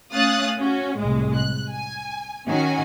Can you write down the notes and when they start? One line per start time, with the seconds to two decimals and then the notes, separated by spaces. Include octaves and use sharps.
0.13 A3 C#4 F5 D#6 F#6 A6
0.59 C#4 F#4
0.97 C2 A2 G#3
1.35 F#6
1.71 G#5
2.47 D#3 C#4 F#4 G#5